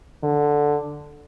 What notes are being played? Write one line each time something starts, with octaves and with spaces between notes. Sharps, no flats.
D3